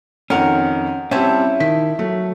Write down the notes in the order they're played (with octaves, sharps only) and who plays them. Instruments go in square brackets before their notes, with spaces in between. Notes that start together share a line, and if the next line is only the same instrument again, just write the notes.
[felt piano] F2 D#3 [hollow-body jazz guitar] C#4 [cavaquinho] F#4 A#4
[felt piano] G3 C4 [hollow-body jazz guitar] C#4 [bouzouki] E4 E5 A5
[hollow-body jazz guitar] D#3 [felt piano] B6
[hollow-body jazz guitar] F#3 [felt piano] A3